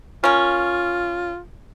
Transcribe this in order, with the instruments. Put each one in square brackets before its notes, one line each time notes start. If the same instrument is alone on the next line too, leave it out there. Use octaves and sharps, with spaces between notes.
[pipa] A#3 C#4 [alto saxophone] F4